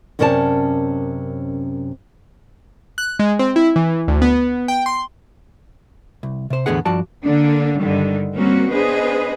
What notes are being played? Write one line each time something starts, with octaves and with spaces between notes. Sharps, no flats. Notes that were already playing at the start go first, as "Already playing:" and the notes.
F#2 C3 C#4 A#4 D5 A5
F#6
G#3
C4
E4
E3
D2
B3
G5
C6
C2
C3 C5
E2 A2 D3 B3 G#4 F#5
G2 F3 F#4 D5 A5
D3 A#3 D4
G2 D3 D#3 G3
G3 A#3 C4 C#4 F#4
B3 D4 G#4 B4 C5 D#5